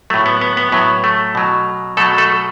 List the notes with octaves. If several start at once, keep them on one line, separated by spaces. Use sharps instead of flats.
A2 F#3 A3
B3
B3
B3
A2 F#3 B3
A3
B2 F#3
B2 F#3 A3 A4
A3 A4